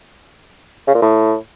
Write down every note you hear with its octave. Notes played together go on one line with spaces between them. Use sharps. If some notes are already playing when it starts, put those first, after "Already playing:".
C#3
A#2
A2